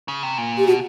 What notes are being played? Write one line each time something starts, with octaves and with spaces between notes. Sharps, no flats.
C#3
C3
A#2
G4
B2 F#4